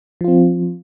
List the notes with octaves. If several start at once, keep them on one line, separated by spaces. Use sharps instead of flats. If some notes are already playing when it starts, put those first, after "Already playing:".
F3 C4 F4